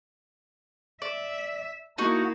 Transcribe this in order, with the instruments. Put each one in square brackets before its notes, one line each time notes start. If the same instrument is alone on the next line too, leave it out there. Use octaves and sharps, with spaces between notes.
[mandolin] D5 [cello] E5
[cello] A#3 E4 [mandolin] D#4 F#4